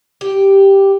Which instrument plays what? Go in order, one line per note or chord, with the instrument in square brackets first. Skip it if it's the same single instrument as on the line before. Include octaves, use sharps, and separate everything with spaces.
[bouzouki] G4